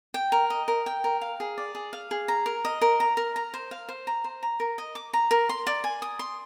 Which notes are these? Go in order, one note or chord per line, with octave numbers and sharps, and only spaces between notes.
G5
A#4
D#5
A#4
G5
A#4
F5
G#4
D5
G#4
F5
G#4
A#5
A#4
D#5
A#4
A#5
A#4
A#5
C5
F5
C5
A#5
C5
A#5
A#4
D#5
D6
A#5
A#4
C6
D5
G#5
D#6
C6